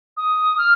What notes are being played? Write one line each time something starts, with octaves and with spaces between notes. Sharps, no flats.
D#6
F6